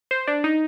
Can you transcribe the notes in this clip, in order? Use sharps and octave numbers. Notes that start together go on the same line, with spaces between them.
C5
D4
D#4